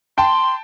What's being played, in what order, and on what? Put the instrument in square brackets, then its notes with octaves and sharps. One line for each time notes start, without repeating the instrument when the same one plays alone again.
[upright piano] G5 A5 [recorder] C6